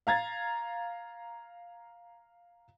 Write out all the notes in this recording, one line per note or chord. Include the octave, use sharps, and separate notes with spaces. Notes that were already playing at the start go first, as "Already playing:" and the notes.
F5 A#5 G#6 A6